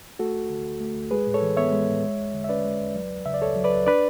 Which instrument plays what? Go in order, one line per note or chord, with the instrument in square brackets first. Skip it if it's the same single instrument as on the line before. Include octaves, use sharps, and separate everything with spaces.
[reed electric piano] A3 F#4 A4
D2
D3
D2
A3
D2
G#3 G#4 B4
A2
A4 C#5
E3
B3 C#5 E5
G#3
A2
G#3
E2
D3
E5
C#4 B4 D5
G#3
E2
F#3
C#2
C#3 E5
D5
C#2 A4 C#5
F#3
B4 D5
C#2
D4 B4 D5